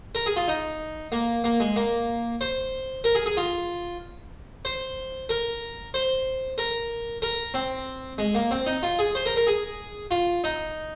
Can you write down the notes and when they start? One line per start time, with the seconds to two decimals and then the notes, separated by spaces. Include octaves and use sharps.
0.15 A#4
0.26 G#4
0.36 F4
0.48 D#4
1.12 A#3
1.44 A#3
1.60 G#3
1.76 A#3
2.41 C5
3.04 A#4
3.15 G#4
3.26 G#4
3.37 F4
4.65 C5
5.29 A#4
5.94 C5
6.58 A#4
7.22 A#4
7.54 C4
8.18 G#3
8.35 A#3
8.51 C4
8.66 D#4
8.83 F4
8.99 G#4
9.15 C5
9.26 A#4
9.36 A#4
9.47 G#4
10.11 F4
10.44 D#4